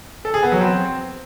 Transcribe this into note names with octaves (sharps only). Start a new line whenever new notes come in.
A4
G#4
B3
F#3
C4